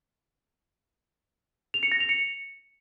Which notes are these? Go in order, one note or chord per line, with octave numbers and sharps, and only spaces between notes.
F7
C#7
A#6
F7
C#7